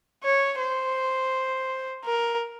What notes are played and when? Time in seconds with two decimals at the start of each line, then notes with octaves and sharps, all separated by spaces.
0.24 C#5
0.60 C5
2.05 A#4